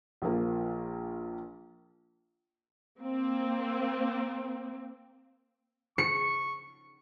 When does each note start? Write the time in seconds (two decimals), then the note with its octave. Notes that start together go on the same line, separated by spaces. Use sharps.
0.22 A#1 F3 A#3
3.00 A#3 C4
5.98 C#6 C#7